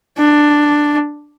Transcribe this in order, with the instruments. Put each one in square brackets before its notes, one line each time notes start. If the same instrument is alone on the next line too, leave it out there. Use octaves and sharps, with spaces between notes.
[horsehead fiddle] D4